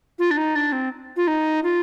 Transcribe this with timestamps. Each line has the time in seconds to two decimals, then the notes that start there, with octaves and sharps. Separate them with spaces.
0.19 F4
0.31 D4
0.37 D#4
0.55 D4
0.72 C4
1.17 F4
1.28 D#4
1.64 F4